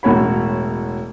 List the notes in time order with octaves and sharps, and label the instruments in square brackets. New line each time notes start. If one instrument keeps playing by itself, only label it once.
[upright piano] E1 A2 F#4 C#5 B5